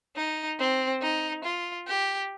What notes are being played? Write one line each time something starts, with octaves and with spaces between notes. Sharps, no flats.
D#4
C4
D#4
F4
G4